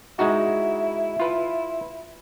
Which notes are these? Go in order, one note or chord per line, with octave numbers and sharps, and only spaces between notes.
G#3 D#4 E4 F#4
F4 B4